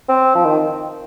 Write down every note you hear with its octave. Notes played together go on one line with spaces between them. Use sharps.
C4
F3
D#3